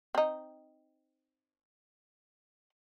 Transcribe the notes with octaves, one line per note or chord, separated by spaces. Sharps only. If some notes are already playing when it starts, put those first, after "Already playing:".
C4 D#4